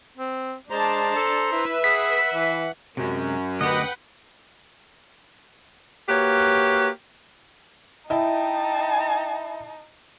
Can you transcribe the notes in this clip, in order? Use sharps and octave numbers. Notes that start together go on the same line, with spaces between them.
C4
G#3 D4 C5 A5 A#5 C6
A4
E4 B4 E5
G#4 F#5 B6
E3
F#2 C3 G#3
D2 G4 B4 D#5 F#5 G5
A#3 F#4 G4 B4 C#5
D#4 E4 D#5 G5 A5